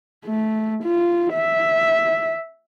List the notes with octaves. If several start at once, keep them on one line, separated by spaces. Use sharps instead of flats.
A3
F4
E5